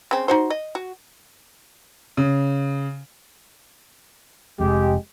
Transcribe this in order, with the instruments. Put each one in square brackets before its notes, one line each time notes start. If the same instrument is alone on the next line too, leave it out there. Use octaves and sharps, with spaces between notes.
[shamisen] C#3 C4
D#4 F#4 C5
D#5
F#4
[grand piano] C#3
[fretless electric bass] F1 F2 [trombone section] G#3 G4